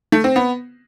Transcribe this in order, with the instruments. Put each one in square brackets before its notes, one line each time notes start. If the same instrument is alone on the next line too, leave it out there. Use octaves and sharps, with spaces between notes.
[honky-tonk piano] A3
C4
B3